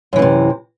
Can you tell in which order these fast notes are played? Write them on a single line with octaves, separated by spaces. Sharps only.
F#2 E3 A2 C3